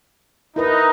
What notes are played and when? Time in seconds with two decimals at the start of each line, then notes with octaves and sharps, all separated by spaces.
0.56 D#4 E4 A#4 B4